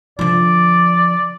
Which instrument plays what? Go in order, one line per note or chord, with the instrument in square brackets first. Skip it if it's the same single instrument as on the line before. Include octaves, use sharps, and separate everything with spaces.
[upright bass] D3 F3 [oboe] D5